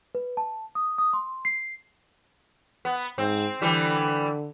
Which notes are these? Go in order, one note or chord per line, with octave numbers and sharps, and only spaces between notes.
B4
A5
D#6
D#6
C6
C7
B3
G#2 C4
D3 E3 G3